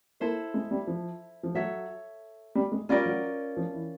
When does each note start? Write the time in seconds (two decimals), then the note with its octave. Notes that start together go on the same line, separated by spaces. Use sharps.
0.20 A#3 E4 A4 C5
0.54 G#3
0.71 G3
0.87 F3
1.43 F3
1.55 F#3 A4 C#5 E5
2.55 G3
2.72 G#3
2.89 G3 C#4 F4 A#4 D5
3.06 F#3
3.57 F3
3.73 E3